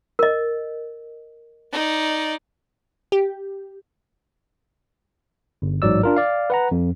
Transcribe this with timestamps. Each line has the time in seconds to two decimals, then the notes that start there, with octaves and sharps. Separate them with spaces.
0.19 A#4 D#5
1.72 D#4 D5
3.12 G4
5.62 G1
5.82 A1 G#2 F#3 D5 E6
6.03 D4 F4 A#4
6.16 D5 F5
6.50 B4 F#5 A#5
6.71 F2